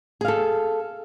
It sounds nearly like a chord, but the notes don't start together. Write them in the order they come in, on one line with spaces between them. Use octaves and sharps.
G#4 F5 A4